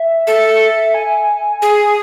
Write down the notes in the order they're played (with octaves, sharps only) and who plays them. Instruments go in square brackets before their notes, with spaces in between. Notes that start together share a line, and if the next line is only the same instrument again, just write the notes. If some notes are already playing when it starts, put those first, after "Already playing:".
Already playing: [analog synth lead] E5
[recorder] A4
[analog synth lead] G#5
[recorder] G#4